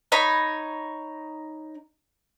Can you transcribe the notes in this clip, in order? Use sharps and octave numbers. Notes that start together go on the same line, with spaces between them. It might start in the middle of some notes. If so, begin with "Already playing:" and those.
D#4 C#5 B5